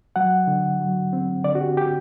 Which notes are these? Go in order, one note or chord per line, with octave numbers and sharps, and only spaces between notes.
F#3 F#5
D3
F#3
C4
D3 D5
F#4
G4
G4